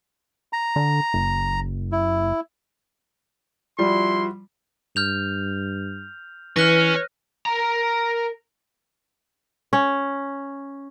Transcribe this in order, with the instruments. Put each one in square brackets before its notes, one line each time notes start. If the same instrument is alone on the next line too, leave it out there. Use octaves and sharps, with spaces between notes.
[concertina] A#5
[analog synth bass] D3
F#1
[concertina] E4
[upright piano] F3 G3 [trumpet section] E4 F#4 C6
[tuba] G2 [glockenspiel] F6 G6 F7
[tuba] E3 [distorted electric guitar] C#4 [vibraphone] B4 [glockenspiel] F6 F#6 A#6
[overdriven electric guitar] A#4 A#5
[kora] C#4